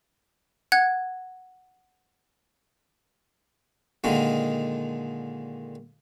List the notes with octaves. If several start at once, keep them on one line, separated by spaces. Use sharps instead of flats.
F#5 F#6 G#6
A#2 D3 D#3 G#3